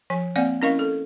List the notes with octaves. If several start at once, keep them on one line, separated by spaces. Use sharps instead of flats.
F3 G#5
A#3 C4 D5 F#5 G#5
C#4 E4 A#4 D#5 F5 C#6
A4